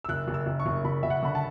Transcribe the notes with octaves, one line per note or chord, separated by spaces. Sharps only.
E6
F#1 F#6
F#1
E6
F#1
C#6
F#1
F#1 B5
F#1 E5
F#5
D3 B5
A5